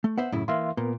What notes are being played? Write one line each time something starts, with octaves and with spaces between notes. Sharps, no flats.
A3
B3 C5 E5 F#5
F#2 A2 C#3 E4
E3 A#3 E5 F5 C6
A#2 B3 A#4